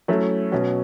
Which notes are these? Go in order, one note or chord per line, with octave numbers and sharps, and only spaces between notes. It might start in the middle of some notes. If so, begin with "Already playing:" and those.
F#3 A3 C#4 E4
B2 F#3 C#4 F#4